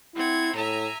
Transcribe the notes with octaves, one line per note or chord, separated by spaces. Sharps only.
C4 E4 F#5 G#6
A2 E5 G#5 A#5